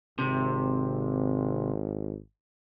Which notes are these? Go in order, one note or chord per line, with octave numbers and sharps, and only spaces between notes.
G#1 C3